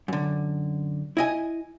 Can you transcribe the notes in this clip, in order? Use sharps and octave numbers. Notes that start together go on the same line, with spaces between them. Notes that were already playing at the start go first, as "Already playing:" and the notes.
F#2 D3
E4 D#5 G#5